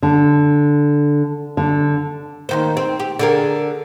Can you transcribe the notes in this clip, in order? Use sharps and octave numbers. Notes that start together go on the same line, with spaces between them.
D3
D3
D#2 D#3 C5
C4
G4
D3 G#4 A#4